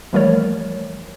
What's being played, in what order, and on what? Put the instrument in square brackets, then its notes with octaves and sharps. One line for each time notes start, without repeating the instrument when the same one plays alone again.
[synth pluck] E3 F3 G3 A3 A#4 C#5